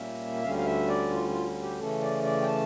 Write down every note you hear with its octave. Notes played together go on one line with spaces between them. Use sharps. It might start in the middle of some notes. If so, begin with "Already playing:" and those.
Already playing: A#2 G3 A#3 C#4 E5
D2 D3 G3 C#4 F5
F5
E5
D5
F4
F4
G4
C#3 E3 A3 C#4 A4
D5
D5
G5
A5